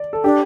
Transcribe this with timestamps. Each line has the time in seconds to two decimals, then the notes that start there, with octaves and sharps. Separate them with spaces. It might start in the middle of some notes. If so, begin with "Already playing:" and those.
Already playing: D5
0.13 A4
0.24 D4 G4